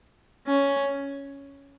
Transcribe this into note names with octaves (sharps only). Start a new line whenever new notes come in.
C#4